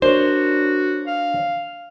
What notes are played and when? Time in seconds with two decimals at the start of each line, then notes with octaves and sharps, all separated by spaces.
0.02 D4 F#4 A#4 C5 C#5
1.07 F5